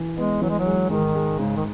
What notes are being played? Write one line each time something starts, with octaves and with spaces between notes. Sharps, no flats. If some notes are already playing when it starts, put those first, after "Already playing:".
Already playing: E3
G#3 B3
E3 F#3
G#3
F#3
G#3
G#2 D#3
G#3
G#2 C#3
D#3